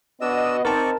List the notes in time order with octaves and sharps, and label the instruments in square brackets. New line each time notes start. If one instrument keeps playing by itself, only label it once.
[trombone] B3 [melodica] D4 E6 [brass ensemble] F#4 D#5
[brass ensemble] C4 D#4 [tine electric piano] A#4 A5 [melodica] D5 C#6